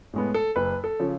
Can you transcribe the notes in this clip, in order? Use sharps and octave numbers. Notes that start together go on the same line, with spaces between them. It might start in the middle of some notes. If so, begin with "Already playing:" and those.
A2 G#3 B3
A4
F#1 B4
A4
C#3 F3